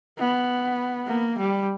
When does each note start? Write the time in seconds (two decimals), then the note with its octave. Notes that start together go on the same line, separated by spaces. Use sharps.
0.19 B3
1.08 A#3
1.39 G3